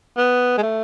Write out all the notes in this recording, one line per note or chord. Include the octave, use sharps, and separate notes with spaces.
B3
G#3
A3